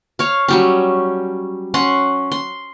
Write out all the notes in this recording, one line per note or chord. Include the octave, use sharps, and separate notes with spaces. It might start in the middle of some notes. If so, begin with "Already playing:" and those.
C#5 F5
F#3 G3 C#4
C#4 F#5 C6
C6